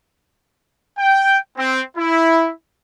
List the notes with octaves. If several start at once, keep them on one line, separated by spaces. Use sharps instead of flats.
G5
C4
E4